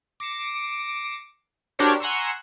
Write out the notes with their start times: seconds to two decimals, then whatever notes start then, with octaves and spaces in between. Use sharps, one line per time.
0.20 D6 A#6 C7 C#7 E7
1.79 D4 F#4 G4 A#4 C5 C#5
2.00 F#5 G#5 A#5 C6 C#6 E6